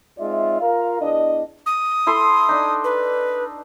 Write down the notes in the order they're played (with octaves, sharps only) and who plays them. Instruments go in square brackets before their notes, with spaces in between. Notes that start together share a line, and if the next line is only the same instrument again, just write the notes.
[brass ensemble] G#3 C4 D#4 F4 D5 E5
F4 A#4 F5
E2 D4 D#5
[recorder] D#6
[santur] E4 A4 C6
D4 D#4
[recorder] B4